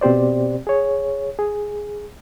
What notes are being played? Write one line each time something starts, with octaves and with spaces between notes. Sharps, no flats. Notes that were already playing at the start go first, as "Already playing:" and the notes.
B2 C4 G4 C5 D5
G#4 C#5
G#4